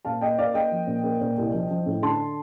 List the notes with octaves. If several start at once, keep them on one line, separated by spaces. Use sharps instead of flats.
A#2 F5 A5
A#3 D#5 G5
A#3 D5 F5
A#3 D#5 G5
F3
A#2
A#3
A#2
C2
F3
F3
A2
D3 A5 C6